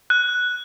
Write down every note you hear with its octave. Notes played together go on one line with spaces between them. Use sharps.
F#6